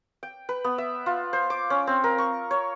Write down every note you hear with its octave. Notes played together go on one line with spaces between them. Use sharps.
G5
B4
B3
E5
F4
C5
D6
C#4
C4
A#4
C#6
C#5